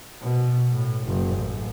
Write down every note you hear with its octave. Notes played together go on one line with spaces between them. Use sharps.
B2
A2
F#1
A1